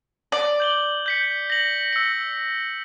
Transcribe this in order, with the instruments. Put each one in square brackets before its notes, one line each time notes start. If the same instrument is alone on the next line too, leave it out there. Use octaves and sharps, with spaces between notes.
[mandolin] D5
[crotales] G6 F#7 G7
G6 B6 C#7
A#6 F#7
E6 C#7